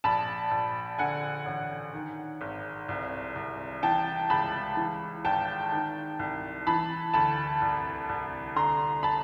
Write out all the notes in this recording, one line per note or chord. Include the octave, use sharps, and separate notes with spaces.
A#1 A5 B5
A#1
D3 F#5 G#5
A1
D#3
G#1
C2
C2
E3 G5 A5
C#2 A5 B5
E3
G#1 G5 A5
D#3
C2
E3 A5 B5
D2 A5 B5
C2
C2
D3 A#5 C6
A5 B5